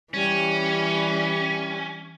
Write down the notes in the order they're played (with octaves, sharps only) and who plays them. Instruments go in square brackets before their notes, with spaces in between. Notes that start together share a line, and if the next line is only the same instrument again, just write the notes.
[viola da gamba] E3 [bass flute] G3 [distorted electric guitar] C#4